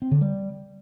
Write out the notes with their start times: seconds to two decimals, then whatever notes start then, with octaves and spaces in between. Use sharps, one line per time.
0.02 C4
0.11 D3
0.21 G3